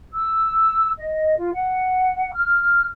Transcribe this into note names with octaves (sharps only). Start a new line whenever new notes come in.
E6
D#5
F4
F#5
F6